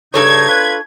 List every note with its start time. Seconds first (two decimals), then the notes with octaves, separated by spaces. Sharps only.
0.14 G2 C#3 D4 D#4 A4 C#5 G#6
0.48 F4 B4